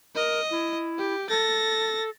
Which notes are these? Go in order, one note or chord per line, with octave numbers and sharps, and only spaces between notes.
A#4 D#5
E4
G4
A4 A6 A#6